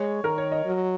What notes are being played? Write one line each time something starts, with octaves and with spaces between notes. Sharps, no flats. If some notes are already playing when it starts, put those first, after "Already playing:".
Already playing: G#3 C#5
D#3 A#4
C#5
D#5
F#3